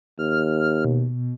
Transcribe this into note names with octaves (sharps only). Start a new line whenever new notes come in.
D#2 F6
B2